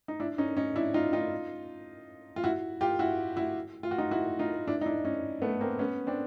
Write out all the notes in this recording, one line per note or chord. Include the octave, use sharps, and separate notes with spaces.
D#4
D4 E4
C#4 D#4
C#4 D#4
D4 E4
D#4 F4
D#4 F4
F4
E4 F#4
F4 G4
E4 F#4
E4 F#4
F4
F#4
D#4 F4
E4 F#4
D#4 F4
D4 E4
D#4
D4 E4
C#4 D#4
A3 B3
A#3 C4
B3 C#4
C4 D4